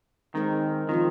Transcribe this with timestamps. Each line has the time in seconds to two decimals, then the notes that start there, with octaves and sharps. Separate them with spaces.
0.35 D#3 G#3 C4 D#4 A#4
0.89 D#3 F3 C4 F4